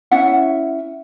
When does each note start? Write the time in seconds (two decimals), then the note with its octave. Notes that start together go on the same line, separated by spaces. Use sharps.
0.11 C#4 E4 E5 F#5